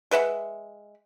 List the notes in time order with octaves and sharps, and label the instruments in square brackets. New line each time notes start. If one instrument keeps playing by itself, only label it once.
[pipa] G#3 B4 E5 F#5